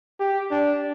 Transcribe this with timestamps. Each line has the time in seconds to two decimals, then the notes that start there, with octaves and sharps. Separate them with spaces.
0.20 G4
0.51 D4